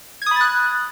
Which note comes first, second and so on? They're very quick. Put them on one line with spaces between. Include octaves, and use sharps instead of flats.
G#6 D#6 B5 A6 F#6